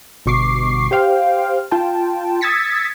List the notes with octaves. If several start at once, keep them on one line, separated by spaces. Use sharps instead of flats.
G1 B2 C#6 D6 C7
G4 C5 F5 G5
F4 G5 A5
D#6 E6 G#6 A6 B6 C#7